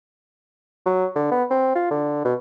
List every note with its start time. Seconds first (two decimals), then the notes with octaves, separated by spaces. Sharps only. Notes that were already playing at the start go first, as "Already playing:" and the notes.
0.86 F#3
1.16 D3
1.32 B3
1.51 C4
1.75 F4
1.91 D3
2.25 B2